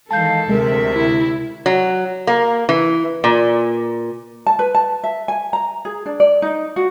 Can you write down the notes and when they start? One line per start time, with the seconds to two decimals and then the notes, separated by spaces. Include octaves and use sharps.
0.11 D#3 E3 G#3 A4 F5 A5 G6
0.49 D2 C3 G#3 A#4 E5
0.94 E4
1.66 F#3
2.27 A#3
2.69 E3
3.24 A#2
4.46 A5
4.59 B4
4.75 A5
5.04 E5
5.28 G#5
5.53 A#5
5.85 G#4
6.06 D4
6.20 D5
6.42 D#4
6.76 F#4